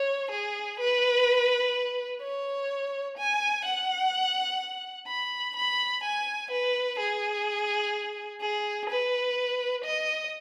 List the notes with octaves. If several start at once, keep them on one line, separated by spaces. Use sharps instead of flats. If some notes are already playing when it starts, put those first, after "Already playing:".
Already playing: C#5
G#4
B4
C#5
G#5
F#5
B5
B5
G#5
B4
G#4
G#4
B4
D#5